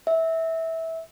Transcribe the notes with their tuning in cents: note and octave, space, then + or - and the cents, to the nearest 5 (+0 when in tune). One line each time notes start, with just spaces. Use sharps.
E5 -15